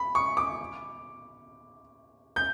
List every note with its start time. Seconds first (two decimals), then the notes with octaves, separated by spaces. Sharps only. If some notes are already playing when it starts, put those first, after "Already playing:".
Already playing: B5
0.15 C#6
0.37 D6
2.36 G6